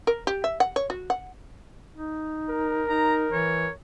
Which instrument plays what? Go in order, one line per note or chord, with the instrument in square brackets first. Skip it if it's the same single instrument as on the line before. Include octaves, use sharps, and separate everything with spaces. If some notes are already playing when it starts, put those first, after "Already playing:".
[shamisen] A#4
G4
E5
F#5
C#5
F#4
F#5
[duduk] D#4
[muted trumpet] A#4
[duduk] D#4 [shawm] A#5
[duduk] E3 [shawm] C#5